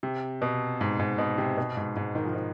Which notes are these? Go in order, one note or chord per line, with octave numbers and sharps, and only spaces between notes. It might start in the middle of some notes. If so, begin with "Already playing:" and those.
C3
B2
G#2
G#2
B2
C3
B2
G#2
G#2
D#3
F3
D#3